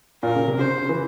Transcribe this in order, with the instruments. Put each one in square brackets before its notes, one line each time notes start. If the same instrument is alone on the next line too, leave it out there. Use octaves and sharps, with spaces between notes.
[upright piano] A#2 [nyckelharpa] A#4
[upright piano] C#3
C3
[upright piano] C#3 [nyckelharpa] C5
[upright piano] C#3
E3